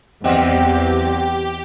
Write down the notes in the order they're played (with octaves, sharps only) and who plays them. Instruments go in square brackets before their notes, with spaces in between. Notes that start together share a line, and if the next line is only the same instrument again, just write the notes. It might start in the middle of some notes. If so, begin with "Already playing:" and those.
[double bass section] E2 [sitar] C3 F#3 D#5 [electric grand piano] C4 F#5 [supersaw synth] G4